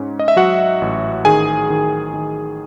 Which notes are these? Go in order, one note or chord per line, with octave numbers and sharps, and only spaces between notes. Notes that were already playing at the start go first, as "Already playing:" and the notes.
Already playing: G#2 C#4
D#5
E5
F#3 F#4 F#5
A1
D#3 G#4 G#5
D#3
D#3